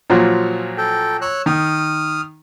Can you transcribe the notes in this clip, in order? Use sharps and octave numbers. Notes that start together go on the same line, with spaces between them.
A#2 F3 F#3
A4 G5
C#5 E6 F#6
D#3 D#6 F6